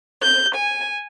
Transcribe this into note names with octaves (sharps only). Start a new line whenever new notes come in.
G6
G#5